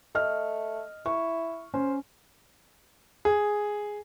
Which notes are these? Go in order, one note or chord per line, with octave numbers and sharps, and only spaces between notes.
A3 D#5 F6
E4 C#6
C#4 C5
G#4